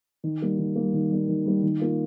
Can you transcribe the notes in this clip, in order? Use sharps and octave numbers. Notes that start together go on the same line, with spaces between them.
D#3
G3 A#3
D#3
G3 A#3
D#3
G3 A#3
D#3
G3 A#3
D#3
A#3 F4